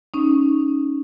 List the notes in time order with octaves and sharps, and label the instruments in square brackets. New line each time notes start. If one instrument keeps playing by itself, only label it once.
[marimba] C#4 D#4